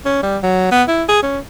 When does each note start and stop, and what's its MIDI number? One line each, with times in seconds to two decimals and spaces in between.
0.05 0.22 61
0.23 0.38 55
0.43 0.69 54
0.72 0.83 59
0.88 1.04 64
1.09 1.22 68
1.23 1.39 61